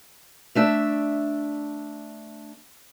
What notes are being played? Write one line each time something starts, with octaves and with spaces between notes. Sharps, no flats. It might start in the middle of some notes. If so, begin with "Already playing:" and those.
A3 D4 E5